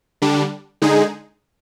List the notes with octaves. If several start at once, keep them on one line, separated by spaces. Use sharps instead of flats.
D3 G3 D4
D3 G#3 D#4 G#4